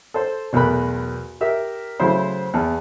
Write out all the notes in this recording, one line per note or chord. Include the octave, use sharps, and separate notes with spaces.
A4 C5
B1 E2 A3 A#4 B5 F#6
G4 A#4 E5
C#3 F#3 A3 E4 C5
E2 A5